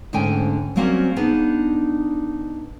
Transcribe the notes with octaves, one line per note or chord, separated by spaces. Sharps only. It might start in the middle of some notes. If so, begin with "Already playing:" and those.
D2 G#2 D3 C#4 G5 G#5
F#3 G3 A#3 C4 C#4 F#4
B3 D4 D#4 G#4